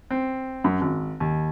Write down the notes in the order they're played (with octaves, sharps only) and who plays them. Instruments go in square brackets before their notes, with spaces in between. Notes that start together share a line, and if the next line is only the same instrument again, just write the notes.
[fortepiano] C4
F#2
G#1
D#2